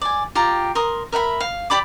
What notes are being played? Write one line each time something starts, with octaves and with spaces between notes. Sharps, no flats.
D5 G#5
F4 G4 A#5
A#4 C6 D#6
A#4 E5 F#5 B5
F5
G4 D5 B5 D6